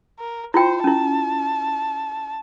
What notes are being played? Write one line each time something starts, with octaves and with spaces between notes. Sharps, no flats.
A#4
E4 F4 C5 G5
C#4 E4 A5